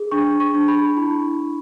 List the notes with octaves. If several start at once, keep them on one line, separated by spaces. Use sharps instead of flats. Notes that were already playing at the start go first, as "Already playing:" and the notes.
Already playing: G#4
D4 C#6
C#6
D4
B5
E4